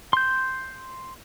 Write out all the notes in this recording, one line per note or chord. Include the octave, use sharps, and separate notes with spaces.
C6 G6